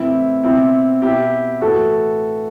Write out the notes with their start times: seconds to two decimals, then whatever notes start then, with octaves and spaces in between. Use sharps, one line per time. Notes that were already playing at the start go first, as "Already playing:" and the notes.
Already playing: A2 E3 C4 E4
0.44 B2 C4 E4
1.02 B2 E4 G4
1.61 A2 E3 F#4 A4